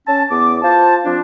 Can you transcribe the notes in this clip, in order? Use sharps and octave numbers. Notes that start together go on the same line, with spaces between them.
C#4 A5
E2 B3 D6
F4 C5 A5
F3 C4 D4